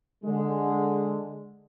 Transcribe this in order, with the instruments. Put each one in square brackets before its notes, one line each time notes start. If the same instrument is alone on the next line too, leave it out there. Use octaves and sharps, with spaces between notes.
[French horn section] D3 G#3